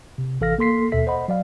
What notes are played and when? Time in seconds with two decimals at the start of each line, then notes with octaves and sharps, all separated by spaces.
0.18 C3
0.41 A1 E3 A4 F5 F6 A#6
0.58 A#3 A4 C6 B6 C7
0.92 D#2 B2 A4 E5 B6
1.07 C5 D#5 F#5 B5
1.28 F#3 D5 F5